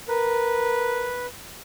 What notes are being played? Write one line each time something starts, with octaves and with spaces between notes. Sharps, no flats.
A#4 B4